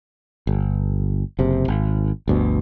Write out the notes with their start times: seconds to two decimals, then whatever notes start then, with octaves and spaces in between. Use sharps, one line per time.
0.47 G1
1.39 F#1 C3
1.68 G#1
2.28 G1 D2 B2